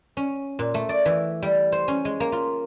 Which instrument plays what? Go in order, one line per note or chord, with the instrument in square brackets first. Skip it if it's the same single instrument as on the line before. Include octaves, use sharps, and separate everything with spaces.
[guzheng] C#4
A#2
A3
D5
E3
G3
C5
C#4
G#3
A#3
F4